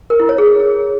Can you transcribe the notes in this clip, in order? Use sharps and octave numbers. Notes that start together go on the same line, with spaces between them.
A#4
E4
C#5
G#4